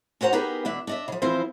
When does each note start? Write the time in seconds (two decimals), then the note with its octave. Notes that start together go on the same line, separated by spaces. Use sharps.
0.21 C#4 F#4 C5 F#5 A#5
0.32 B3 D#4 G4 G#4 A#4 B4
0.65 E2 B2 D4 E5
0.87 D4 D#5 E5
1.08 C#3 F3
1.22 E3 F3 C4 E4 F4 C5